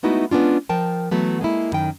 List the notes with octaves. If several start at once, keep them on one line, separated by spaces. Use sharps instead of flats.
G#3 A3 B3 D#4 E4 F#4
G#3 B3 C#4 D4 F4
F3 A#4 G5 A5
E3 F#3 A3 B3
G#3 A#3 E4
F#2 D#3 G5